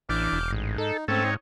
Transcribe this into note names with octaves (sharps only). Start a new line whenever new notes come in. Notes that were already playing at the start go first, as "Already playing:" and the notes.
A1 E3 D4 D6 F6 G6
E1
A1 G#2
D#4 A4
G#2 A3 C4 C#4 A4
D#4 C#5